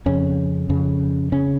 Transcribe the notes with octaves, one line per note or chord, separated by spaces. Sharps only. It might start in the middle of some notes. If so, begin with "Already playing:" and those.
F2 C#3 C#4
F2 C#3
C#3 C#4